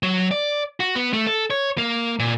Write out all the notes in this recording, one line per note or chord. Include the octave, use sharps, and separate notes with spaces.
F#3
D5
F#4
B3
A3
A4
C#5
A#3
A#2